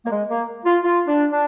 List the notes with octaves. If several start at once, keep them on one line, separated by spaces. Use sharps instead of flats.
A#3
G#3
A#3
F4
F4
D4
D4